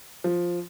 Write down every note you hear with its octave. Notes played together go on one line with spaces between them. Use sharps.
F3